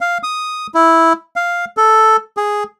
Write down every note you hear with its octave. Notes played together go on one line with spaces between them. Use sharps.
F5
D#6
E4
F5
A4
G#4